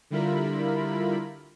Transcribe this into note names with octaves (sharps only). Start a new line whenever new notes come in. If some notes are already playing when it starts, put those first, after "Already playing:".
D3 G3 E4 F4 A#4 B5